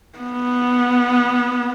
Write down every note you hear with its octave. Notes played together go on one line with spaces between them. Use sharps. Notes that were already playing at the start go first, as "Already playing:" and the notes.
B3